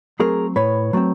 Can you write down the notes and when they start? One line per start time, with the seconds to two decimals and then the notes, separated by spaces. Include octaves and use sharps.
0.19 F#3 A3 C4 G#4 A#4
0.56 A2 B4 C#5
0.93 F#3 A3 C4